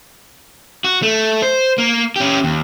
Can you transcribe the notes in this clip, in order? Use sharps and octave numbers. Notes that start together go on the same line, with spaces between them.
F#4
A3
C5
A#3
C#4 G4
D#2